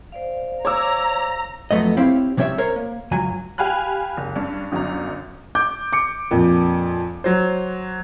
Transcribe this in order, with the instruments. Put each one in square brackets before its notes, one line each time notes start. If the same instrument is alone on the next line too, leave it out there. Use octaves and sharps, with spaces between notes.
[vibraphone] C5 D5 F5
[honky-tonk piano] C#5 D6 E6 [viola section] A#5
[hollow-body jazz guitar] F2 F#3 A3 B3 D#5
C4 E4 G4 C#5 F5
C3 G3 C#4 C#5 E5
A#4 C5 C#5
A#3
C#2 G2 F#3 G#5
[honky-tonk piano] G4 F5 G#5 B5 F#6
F#1
G2 C#4 D4
G1 F#2 C#4 A#5
[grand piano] D6 G6
D6 C#7
F2 A#2
F#3 C5